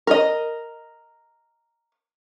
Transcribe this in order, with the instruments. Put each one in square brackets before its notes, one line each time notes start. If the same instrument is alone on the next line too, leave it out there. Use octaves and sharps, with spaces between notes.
[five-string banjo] A#4 D#5